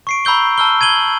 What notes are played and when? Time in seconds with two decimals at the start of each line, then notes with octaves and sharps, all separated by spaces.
0.07 C#6 C7 D7
0.25 A#5 B5 E6 G6 G7
0.58 A5 E6 F6 G7
0.81 G#6 D#7 F#7 G7